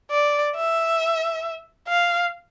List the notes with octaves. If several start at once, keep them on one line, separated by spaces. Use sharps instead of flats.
D5
E5
F5